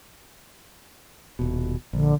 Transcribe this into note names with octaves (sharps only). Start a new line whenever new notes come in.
D#1 B2
A#1 D3